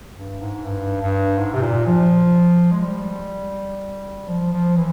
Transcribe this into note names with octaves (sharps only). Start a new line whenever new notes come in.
G2
G#2
G2
G2
G#2
C3
A#2
F3
G#3
G3
F3
F3
E3